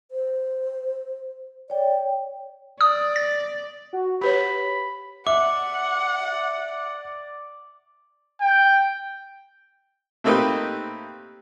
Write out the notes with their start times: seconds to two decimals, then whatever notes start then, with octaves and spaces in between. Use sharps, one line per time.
0.11 C5
1.70 C#5 D5 G5
2.81 D5 D#6
3.16 A6
3.93 F#4
4.21 G4 B4 C#5 B5
5.27 D5 E5 F#5 D6
8.41 G5
10.24 A3 A#3 C4 D#4 G4 B4